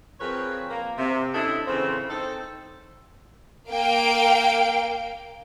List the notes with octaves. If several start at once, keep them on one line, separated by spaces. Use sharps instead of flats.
F3 C4 G#4 A#4 B4 C#5
A#3
C3
C#4 D4 E4 A4 D#5
A2 C#3 E3 F3 C4
C4 D#4 A4
A#3 F5 G5 D7